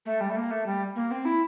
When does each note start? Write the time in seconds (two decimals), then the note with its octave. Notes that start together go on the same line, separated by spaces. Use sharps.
0.06 A3
0.21 G3
0.30 A3
0.36 A#3
0.51 A3
0.66 G3
0.96 A#3
1.11 C4
1.25 E4